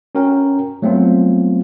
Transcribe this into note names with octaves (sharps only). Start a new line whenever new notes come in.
C#4 F#4 A#4 G5
F#3 A3 B3 C4 F4